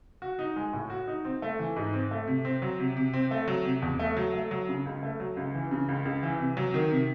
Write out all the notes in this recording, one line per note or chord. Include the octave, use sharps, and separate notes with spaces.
F#4
D#4
G#3
A2
F#4
D#4
C4
A3
E3
G#2
C4
A3
C3
C4
F#3
C3
C3
C4
A3
F#3
C3
E2
A3
F#3
A3
F#3
C#3
C#2
A3
F#3
C#2
E3
C#3
C#2
C#2
E3
C3
F#3
D#3
C3